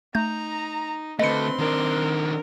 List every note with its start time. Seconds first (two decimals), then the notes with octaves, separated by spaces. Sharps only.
0.15 A3 D#4 A#5 G6
1.19 D3 A3 C4 B4 D#5 C6 C#7
1.59 D#3 D4 A#4